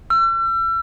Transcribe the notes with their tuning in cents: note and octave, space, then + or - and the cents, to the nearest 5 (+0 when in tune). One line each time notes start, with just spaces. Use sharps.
E6 +40